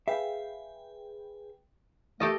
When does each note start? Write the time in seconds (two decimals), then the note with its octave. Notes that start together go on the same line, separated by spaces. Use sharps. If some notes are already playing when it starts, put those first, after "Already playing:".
0.08 G#4 B4 E5 F5 G5
2.20 A3 G4 A4 D#5